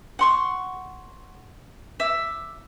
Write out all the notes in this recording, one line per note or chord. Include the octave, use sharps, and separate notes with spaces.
F#5 C6 C#6
E5 D6